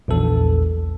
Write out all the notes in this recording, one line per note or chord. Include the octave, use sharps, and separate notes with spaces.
A#1 E2 A4